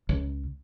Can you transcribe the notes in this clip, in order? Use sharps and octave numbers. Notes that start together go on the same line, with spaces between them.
C#2